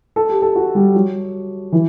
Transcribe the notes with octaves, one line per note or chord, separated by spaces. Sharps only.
A4
G4
A4
F#4
G3
F#3
E3